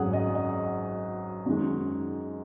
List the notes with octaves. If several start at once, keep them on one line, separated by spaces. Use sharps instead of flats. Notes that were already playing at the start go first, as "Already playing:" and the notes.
Already playing: G#1 F#2 F#3 G#4 F#5
D#5
D#5
F#2 D#3 G#3